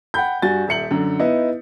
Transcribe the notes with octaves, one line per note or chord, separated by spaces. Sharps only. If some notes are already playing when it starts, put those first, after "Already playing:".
F#5 G5 B5 G6
G2 F#4 G#5 A6
D#1 E5 C#7 F#7
F#2 D3
B3 D#4 E4 D#5